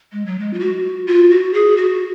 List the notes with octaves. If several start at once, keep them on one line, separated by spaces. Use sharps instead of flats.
G#3
F#3
G#3
F4
F#4
F4
F#4
G#4
F#4